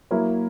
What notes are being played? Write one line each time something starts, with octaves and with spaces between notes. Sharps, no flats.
F#3 A#3 E4 A#4 C#5